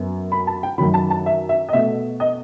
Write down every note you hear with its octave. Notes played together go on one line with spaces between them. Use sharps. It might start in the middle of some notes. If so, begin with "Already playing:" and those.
Already playing: F#2 F#3 B3
B5
A5
G5
F#2 D#3 F#3 B5
A5
A5
E5
E5
D#5
B2 A3 E5
D#5